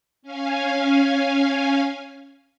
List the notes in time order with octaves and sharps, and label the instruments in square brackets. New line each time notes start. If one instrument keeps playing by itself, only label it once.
[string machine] C#4 F5 G#5